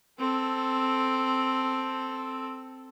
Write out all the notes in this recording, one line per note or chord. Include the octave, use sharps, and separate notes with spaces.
C4 A4